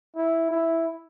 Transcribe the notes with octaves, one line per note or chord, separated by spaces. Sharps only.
E4
E4